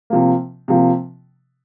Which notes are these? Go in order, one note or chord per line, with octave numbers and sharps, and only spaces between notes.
C3 F3 A#3
C3 F3 A#3